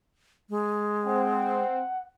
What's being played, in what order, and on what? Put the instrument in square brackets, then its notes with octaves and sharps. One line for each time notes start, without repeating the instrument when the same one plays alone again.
[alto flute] G#3
[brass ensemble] C4 [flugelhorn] F#5